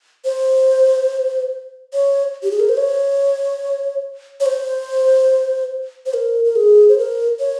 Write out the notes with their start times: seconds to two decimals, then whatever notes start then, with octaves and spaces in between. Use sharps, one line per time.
0.25 C5
1.94 C#5
2.43 G4
2.51 G#4
2.60 A#4
2.69 C5
2.77 C#5
4.40 C#5
4.46 C5
6.06 C5
6.14 A#4
6.45 A#4
6.56 G#4
6.89 C5
6.98 A#4
7.40 C#5